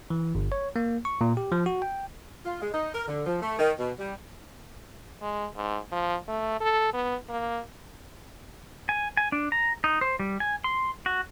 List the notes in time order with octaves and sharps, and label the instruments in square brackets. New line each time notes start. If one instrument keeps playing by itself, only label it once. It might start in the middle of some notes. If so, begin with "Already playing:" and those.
[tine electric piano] E3
G1
C#5
A#3
C#6
A#2
G4
F3
F#4
G5
[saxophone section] F4
G#3
D#4
A#4
D3
F3
A3
D#3
B2
G3
[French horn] G#3
G#2
F3
A3
A4
B3
A#3
[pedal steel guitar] G#5
G#5
D4
A#5
D#4
C5
G3
G#5
C6
F#4